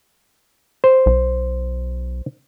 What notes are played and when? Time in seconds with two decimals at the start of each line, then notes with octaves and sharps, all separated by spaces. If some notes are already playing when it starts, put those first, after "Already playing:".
0.84 C5
1.06 B1